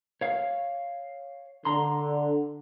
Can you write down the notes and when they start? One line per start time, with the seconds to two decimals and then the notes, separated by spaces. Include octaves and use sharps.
0.21 C#5 F5
1.65 D3 A#5 C6